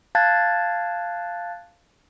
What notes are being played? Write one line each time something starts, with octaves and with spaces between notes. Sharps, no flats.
F5 A5 F#6 G#6 A6